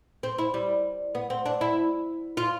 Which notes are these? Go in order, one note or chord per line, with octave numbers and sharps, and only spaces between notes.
C4
E4
G3
B3
C4
D4
E4
F4